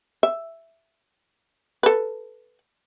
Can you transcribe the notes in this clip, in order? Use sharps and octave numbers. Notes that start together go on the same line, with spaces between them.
E5
A4 B4